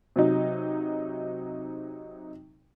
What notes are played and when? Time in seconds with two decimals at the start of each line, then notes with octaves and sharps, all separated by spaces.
0.16 C3 F#3 D#4